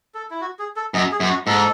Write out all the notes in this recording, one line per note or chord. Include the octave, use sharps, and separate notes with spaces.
A4
E4
F#4
G#4
A4
F#2 D#5
G#4
F#2
F#4
G#2 A4